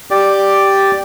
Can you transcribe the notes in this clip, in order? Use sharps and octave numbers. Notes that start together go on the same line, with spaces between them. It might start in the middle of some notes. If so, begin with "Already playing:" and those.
G4 D5